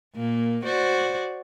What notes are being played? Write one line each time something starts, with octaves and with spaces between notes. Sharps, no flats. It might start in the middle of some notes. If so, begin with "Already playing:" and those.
A#2 A#3
F#4 C5 D5